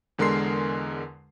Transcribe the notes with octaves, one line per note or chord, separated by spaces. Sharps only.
E2 D3 G#3 A#4 C6 C7